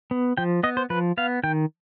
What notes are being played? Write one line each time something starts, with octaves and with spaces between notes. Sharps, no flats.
B3
F3 G5
B3 D#5
C5
F3 B4
B3 F5
D#3 G5